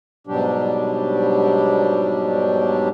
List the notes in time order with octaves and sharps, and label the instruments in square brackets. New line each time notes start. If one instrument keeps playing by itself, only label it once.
[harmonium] G#2 B2 F#3 G3 D4 G4